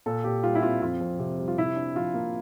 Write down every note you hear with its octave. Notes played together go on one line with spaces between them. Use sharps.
A#2 A4
A#2 G4
G3 F4
E4
C4 F4
F2 F4
F2
C3
G3
F4
C3 E4
D4
F3 F4
A#3